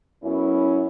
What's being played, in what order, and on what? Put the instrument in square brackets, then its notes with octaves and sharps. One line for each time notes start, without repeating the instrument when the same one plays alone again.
[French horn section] F#2 B3 C#4 E4